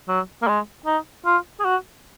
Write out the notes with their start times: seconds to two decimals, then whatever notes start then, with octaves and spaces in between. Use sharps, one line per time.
0.08 F#3
0.42 A#3
0.48 G#3
0.86 D#4
1.25 F4
1.60 G#4
1.65 F#4